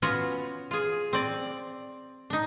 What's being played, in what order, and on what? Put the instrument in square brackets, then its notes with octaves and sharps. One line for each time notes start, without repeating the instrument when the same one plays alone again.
[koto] B3 C#4 F4 F#4
F4 G#4
C4 D5
D4 D#4